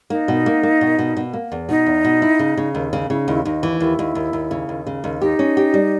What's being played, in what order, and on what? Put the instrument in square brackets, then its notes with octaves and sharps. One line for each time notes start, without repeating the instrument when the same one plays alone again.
[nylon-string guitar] A#3 [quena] D#4
[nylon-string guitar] B2
A#3
A#3
B2
B2
B2
A#3
E2
[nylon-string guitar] B2 [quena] D#4
[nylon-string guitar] E2
B2
E4
C#3
C#3
D#2
C#3
[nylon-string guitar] C#3 [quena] E4
[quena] D#4
[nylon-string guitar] D#2 [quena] E4
[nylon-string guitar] D#2 [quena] D#4
[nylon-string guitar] E3
[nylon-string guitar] D#2 [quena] E4
[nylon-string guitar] D#2
D#2
D#2
C#3
D#2
C#3
D#2
[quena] D#4 [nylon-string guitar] G4
[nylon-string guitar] C#4
G4
G3